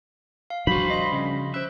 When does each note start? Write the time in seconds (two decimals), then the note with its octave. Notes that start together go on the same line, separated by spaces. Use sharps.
0.50 F5
0.67 F3 G3 D4 F#4 C5 B5
0.90 D#5 C6
1.12 C#3
1.54 C5 E5 F#6